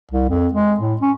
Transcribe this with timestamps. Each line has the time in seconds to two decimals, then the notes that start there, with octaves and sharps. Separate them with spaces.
0.11 C2
0.29 F2
0.53 G#3
0.80 A2
1.01 C#4